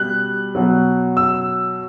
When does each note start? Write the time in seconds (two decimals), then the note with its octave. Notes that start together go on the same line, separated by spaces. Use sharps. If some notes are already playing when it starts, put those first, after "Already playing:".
Already playing: B2 G3 F#6
0.55 B2 F#3
1.17 E6